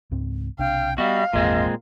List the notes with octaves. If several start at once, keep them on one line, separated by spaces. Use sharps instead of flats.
C#2 G#2 C4
B1 C3 D4 F5 G5
G3 B3 F#4 D#5 F5
G#1 E2 A#2 G#3 C4 D#5